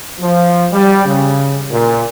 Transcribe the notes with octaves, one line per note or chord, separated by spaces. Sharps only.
F3
G3
C#3
A#2